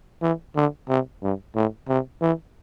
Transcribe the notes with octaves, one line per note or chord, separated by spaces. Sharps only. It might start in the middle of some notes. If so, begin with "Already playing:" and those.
E3
D3
C3
G2
A2
C3
E3